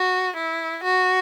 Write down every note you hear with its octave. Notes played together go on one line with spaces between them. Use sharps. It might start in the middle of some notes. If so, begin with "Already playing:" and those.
Already playing: F#4
E4
F#4